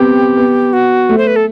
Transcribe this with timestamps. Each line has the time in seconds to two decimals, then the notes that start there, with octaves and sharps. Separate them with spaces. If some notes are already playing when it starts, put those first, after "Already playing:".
Already playing: B3 C4 G4
0.37 B3
0.73 F#4
1.09 A3
1.18 C5
1.27 B4
1.36 A4